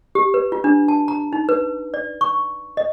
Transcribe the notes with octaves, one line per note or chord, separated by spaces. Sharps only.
G4
B4
F4
D4
A5
A#5
D#4
B4
D5
C#6
D#5